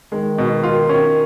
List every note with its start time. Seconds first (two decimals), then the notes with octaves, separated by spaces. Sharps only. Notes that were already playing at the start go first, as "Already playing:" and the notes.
0.12 D#3 G#3
0.38 B2
0.63 F4
0.89 C#4